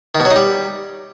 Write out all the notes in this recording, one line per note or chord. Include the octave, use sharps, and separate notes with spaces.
D#3
B2
F#3
D#4
G3